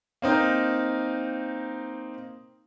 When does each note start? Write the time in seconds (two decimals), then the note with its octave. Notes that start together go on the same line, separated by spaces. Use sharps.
0.22 A#3 C4 D#4